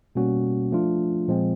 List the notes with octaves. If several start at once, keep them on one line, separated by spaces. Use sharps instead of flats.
B2 G3 A#3 C#4 F#4
F3 A3 D4 F4
A#2 F3 G#3 C4